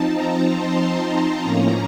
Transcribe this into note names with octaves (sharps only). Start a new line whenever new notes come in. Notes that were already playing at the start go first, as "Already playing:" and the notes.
Already playing: F3 C4 D#4 A5
A#5
C6
A#5
A5
A2 F3 A#3 C#4 A#5